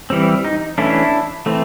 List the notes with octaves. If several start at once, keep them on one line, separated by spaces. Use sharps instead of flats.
E3 G3 C4
D#4
E3 A3 C#4 D4 E4
E3 A3 C4